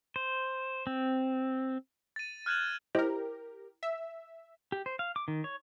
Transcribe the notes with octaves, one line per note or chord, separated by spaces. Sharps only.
C5
C4
A6 D#7
F6 F#6 G#6 D#7 E7 F#7
E4 G4 A#4 C5 D#5
E5
G4
C5
F5
D6
D#3
C#5